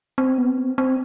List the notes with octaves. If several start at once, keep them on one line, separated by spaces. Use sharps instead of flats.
C4
B3
C4
C4